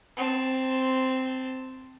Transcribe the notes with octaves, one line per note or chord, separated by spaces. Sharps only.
C4 A5